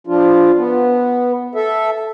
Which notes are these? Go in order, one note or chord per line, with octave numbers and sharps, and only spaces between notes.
F3 D4 F4
B3
A4 E5